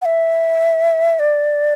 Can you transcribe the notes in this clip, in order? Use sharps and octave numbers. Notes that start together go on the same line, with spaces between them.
F#5
E5
D5